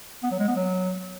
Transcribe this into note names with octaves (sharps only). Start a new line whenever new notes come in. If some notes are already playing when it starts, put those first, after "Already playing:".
B3
F#3
G#3
B3
F#3